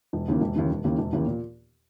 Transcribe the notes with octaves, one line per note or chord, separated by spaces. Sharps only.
E1
D#2 C#3 E3 A#3
E1
D#2 C#3 E3 A#3
E1
D#2 C#3 E3 A#3
E1
D#2 C#3 E3 A#3
A#2